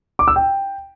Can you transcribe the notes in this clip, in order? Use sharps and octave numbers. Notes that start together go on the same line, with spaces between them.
D6
E6
G5